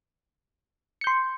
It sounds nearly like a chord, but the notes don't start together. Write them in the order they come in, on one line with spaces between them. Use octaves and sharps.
C#7 G6 C6